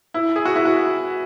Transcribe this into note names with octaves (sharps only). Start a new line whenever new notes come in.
E4
G#4
F#4
E4
F#4